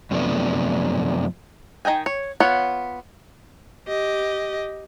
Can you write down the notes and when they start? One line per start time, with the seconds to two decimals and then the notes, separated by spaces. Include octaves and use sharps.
0.11 F#2 C3 F3 A3 B3 D4
1.85 D#3 D#5 G5 G#5
2.06 C#5
2.40 B3 F4 C#5 F#5
3.88 G4 D#5